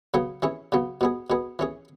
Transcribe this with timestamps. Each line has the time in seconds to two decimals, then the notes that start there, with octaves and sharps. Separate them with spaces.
0.14 C#3 F#3 B3 G#4
0.42 E3 C#4 E4 G#4
0.72 C#3 F#3 B3
1.01 B2 B3 G#4
1.30 B2 B3 G#4
1.59 E3 C#4 G#4